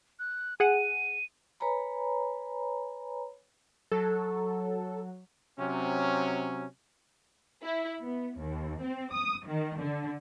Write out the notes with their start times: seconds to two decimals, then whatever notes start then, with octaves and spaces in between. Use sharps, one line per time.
0.19 F#6
0.60 G#4 F#5 D#7
1.60 B4 C#5 G#5 A#5 B5
3.91 F#3 A4
5.59 C3 F#3 C4 C#4
7.63 E4
8.01 B3
8.38 D#2
8.80 C4
9.12 D#6
9.47 D#3
9.79 D3